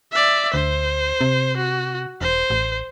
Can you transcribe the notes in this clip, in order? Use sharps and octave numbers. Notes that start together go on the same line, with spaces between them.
D5 E5
D2 C5
C3
F#4
E1 C5
A1